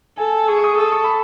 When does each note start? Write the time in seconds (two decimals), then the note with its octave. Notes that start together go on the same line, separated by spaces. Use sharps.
0.17 A4 G#5
0.48 G#4 C#6
0.58 C#6
0.64 D#6
0.78 A4 D#6
0.92 C#6
1.04 B5